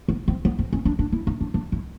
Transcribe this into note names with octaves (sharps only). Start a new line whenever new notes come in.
B3
C4
B3
C4
C#4
D4
D4
E4
D#4
D4
D4
E4